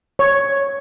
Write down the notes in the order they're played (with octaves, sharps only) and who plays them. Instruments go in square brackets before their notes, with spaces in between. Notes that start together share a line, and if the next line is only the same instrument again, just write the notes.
[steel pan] C#5